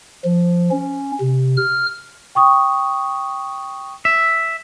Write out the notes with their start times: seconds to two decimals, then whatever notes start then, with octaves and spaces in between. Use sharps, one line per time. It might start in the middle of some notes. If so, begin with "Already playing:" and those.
0.24 F3
0.71 C#4
1.20 C3
1.57 F6
2.35 G5 C#6 D#6
4.05 E5